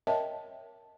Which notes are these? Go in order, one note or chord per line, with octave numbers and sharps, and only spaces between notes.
A#4 C#5 D#5 E5 G5 A5